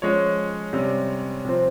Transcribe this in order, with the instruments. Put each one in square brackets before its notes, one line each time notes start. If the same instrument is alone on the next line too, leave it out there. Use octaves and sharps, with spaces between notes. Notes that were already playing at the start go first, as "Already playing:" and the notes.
[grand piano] F3 G#3 C#4 C#5
C3 G3 C#4
C3 F3 C4